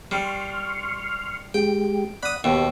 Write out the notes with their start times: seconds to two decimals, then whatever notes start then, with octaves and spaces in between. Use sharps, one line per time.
0.11 G3 C6 C#6 F6
1.54 G#3 G4 G5
2.23 D5 F#5 B5 D#6
2.44 D#2 B2 G4